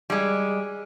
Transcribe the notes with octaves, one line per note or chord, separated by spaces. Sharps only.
G3 G#3